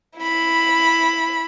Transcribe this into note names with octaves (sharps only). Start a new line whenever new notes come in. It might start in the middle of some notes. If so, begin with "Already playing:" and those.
E4 B5